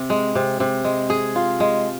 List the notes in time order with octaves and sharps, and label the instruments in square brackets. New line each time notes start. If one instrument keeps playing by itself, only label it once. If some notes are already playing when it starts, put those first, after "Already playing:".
Already playing: [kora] C3 C4
G#3
C3
C3
G#3
G#4
F4
G#3